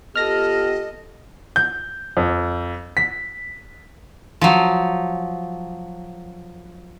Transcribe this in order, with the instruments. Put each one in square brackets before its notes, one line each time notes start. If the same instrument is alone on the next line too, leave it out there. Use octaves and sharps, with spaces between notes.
[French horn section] B3 F4 G4 [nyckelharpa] A4 [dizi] D#5 [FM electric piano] F6 A#6
[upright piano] G6
F2
B6
[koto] F3 F#3